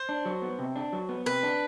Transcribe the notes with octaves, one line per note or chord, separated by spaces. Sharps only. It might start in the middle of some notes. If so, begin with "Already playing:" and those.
Already playing: C5
D4
F#3
B3
C3
D4
F#3
B3
C3 B4
D4